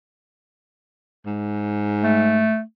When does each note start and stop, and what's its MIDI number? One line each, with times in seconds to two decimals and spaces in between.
1.26 2.52 44
2.03 2.61 57